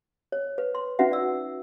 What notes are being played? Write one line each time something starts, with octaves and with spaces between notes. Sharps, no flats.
C#5
B4
C6
C#4 D#4 F#4 B4 E5 F#5
D5 E6